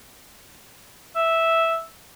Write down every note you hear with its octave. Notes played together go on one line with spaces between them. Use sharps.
E5